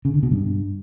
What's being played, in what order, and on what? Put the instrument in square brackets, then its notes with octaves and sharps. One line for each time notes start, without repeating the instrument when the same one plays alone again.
[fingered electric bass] C#3
D3
B2
G2